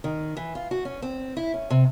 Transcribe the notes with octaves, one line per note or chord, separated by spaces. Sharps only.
D#3
E3
F4
F#4
C#4
C4
E4
C#4
C3